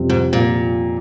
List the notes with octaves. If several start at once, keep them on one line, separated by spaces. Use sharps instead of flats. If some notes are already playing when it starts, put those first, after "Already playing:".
Already playing: F2 C3 G3 C4
G#2
A#2